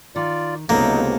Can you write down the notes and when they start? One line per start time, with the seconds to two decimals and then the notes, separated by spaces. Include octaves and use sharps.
0.16 D#3 F4 D5
0.69 C#2 C3 F#3 A#3 B3 D#4 A4